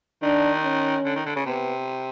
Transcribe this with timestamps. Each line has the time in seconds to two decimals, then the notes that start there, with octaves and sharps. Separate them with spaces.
0.22 D#3 D4
0.63 C#4
1.05 D3
1.16 D#3
1.26 D3
1.36 C#3
1.45 C3 B3